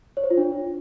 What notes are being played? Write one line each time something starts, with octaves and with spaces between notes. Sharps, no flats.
C#5
C5
F4
D4